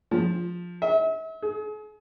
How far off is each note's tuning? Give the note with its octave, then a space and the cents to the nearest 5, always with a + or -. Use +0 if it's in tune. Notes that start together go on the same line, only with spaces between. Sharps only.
F3 +10
E5 -40
G#4 +40